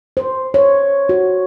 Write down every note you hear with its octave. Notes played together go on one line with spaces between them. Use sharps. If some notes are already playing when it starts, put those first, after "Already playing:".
C5
C#5
F#4